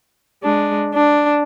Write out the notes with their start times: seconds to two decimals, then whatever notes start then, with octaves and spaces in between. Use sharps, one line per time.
0.43 G#3 D4
0.95 D4